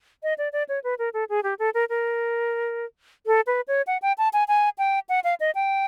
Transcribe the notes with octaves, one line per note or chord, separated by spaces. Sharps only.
D#5
D5
D5
C#5
B4
A#4
A4
G#4
G4
A4
A#4
A#4
A4
B4
C#5
F#5
G5
A5
G#5
G#5
G5
F#5
F5
D#5
G5